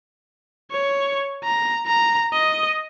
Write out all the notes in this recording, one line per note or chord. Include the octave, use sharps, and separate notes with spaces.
C#5
A#5
A#5
D#5